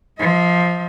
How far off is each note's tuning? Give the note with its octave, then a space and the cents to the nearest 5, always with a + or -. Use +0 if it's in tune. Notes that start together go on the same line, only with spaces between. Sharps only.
F3 +0 D#5 +45